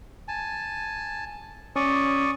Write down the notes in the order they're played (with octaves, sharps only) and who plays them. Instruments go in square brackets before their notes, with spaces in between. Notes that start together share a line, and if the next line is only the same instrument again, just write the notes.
[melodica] G#5 A5
[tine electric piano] C#4 [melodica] D5 C#6 D#6